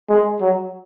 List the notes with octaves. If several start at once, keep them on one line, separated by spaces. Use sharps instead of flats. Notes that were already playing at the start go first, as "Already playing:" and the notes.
G#3
F#3